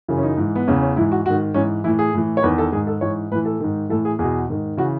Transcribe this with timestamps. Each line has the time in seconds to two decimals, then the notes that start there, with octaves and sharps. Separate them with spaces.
0.08 F#2 C#3 E3
0.18 C#4
0.23 D#4
0.37 G#2 E3
0.55 B3
0.67 E2 C#3 E3 C#4
0.81 C#4
0.96 G#2 E3 E4
1.12 F#4
1.25 G#2 F#4
1.30 D#3
1.54 G#2 E3 C#4
1.84 A2 E3 E4
1.99 G#4
2.14 A2 E3
2.37 C#5
2.42 E2 D#3 B4
2.58 A4
2.72 G#2 D#3 G#4
2.87 A4
3.01 G#2 E3 C#5
3.31 A2 B4
3.35 E3
3.45 A4
3.60 G#2 D#3
3.89 A2 E3 A4
4.05 G#4
4.19 E2 B2 G#4
4.49 G#2 D#3
4.77 C#3 E3 F#4